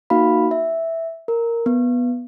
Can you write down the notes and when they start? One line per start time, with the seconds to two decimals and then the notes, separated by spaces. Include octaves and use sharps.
0.10 A#3 D#4 F#4 F5 B5
0.51 E5
1.28 A#4
1.66 B3